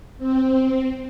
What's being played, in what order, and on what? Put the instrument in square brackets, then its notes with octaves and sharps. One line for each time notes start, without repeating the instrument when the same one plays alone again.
[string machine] C4